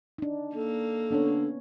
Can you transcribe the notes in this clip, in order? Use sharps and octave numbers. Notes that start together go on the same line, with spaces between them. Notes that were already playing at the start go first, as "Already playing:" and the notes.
D4 D#4
A#3 A4
D3 B3 C#4 C#5